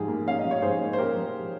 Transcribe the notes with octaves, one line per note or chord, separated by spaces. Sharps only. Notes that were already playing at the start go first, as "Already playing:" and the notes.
Already playing: G#2 F3 G4 G#4
A#3
C#4 F5
D#5
F3
C#5
G#2 G#4 C5
A#3
C5
C#4 G4 A#4
F3